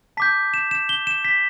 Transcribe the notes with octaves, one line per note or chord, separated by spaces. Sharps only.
A5 D6 G6 B6
E7
E7
G7
E7
B6